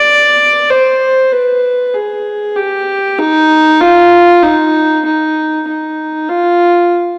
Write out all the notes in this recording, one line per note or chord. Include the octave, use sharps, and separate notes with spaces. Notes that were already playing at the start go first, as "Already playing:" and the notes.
Already playing: D5
C5
B4
G#4
G4
D#4
F4
D#4
D#4
D#4
F4